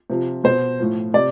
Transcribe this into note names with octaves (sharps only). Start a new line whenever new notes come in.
C3 F3
B2 C5
A2 F3
C3 D5